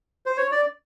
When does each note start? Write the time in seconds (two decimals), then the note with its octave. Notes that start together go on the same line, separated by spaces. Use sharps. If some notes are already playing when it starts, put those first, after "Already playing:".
0.26 C5
0.37 C#5
0.52 D5